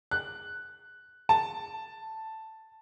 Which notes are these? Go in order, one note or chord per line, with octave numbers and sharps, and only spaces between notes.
F#6
A5